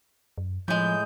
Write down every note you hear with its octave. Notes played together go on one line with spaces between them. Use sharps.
F#2
A2 F3 G#3 G6